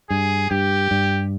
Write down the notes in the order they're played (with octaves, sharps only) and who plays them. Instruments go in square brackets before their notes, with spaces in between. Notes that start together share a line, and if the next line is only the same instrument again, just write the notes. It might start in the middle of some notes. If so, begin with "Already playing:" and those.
[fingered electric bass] G2 [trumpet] G#4
[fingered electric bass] G2 [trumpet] G4
[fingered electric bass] G2